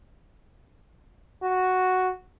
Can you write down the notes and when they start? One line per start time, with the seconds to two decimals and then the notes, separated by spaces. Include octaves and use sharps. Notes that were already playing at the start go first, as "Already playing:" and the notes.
1.43 F#4